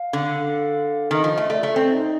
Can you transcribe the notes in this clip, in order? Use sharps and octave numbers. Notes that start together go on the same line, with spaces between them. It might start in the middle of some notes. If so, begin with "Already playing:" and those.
Already playing: F5
D3
D#3 D#5
F3
A3
A3 D5
A3
C4
D#4